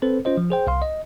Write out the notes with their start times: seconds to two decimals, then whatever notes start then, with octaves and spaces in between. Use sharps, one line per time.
0.02 C4 A4 B4 C5
0.25 C#4 F4 C5 D#5
0.37 F3
0.50 G#4 C5 G5
0.67 C2 F5 C6
0.82 D#5